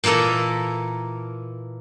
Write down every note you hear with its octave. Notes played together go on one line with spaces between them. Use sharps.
A#2 E3 A#3 A4 D#5